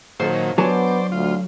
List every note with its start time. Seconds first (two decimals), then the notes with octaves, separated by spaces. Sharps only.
0.20 A#2 D#3 F#3 A4 C5
0.58 F#3 B3 D4 C5 D5 G#5 A5
1.12 D2 F4